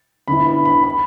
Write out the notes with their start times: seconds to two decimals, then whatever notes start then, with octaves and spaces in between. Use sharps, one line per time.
0.28 D3 B3 E4 B5
0.47 B5
0.65 B5
0.84 B5